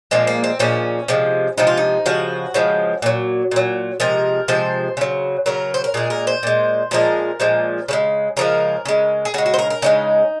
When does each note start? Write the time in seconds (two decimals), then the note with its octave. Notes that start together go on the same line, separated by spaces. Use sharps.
0.11 A#2 F3 G#3 C4
0.27 A#3
0.44 C4
0.59 A#2 F3 G#3 C#4
1.08 C3 F3 G#3
1.58 C3 F3 G#3 D#4
1.67 F4
1.77 D#4
2.06 C#3 F3 G#3 F#4
2.54 C#3 F3 G#3
3.02 A#2 F#3
3.51 A#2 F#3
4.00 C3 F3 G#3 A#4
4.48 C3 F3 G#3 C5
4.97 C#3 F#3
5.46 C#3 F#3 A#4
5.74 C5
5.84 A#4
5.94 A#2 G#3 G#4
6.10 A#4
6.27 C5
6.43 A#2 G#3
6.91 A#2 F3 G#3 A#4
7.40 A#2 F3 G#3
7.88 C#3 F3 G#3
8.37 C#3 F3 G#3 A#4
8.85 C#3 G#3
9.25 G#4
9.34 C#3 F#4
9.38 G#3
9.46 F#4
9.54 C5
9.59 A#4
9.70 A#4
9.82 C#3 F3 G#3 D#4